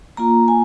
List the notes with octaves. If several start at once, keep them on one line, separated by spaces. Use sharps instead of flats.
A#3 F4 A#5
G#5